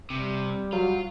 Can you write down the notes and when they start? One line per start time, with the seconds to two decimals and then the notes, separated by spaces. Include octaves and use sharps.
0.10 C3 G3
0.72 F#3 F4